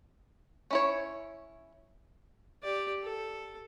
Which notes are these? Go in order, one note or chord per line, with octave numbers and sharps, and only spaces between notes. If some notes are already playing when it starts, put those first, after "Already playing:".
C#4 E4 C#5
G4 D5
A4